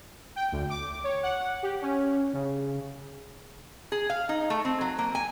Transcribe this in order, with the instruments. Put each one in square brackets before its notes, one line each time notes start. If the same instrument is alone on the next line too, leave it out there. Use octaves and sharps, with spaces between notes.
[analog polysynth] G5
D2
D6
C#5
F#5
G4
C#4
C#3
[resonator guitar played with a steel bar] G#4
F5
D#4
A3
C4
F#3
A#3
G#5